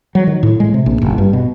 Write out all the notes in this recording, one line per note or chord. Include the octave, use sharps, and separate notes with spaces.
F#3
D#3
A2
G#3
C3
A#1
F#1
G2
B2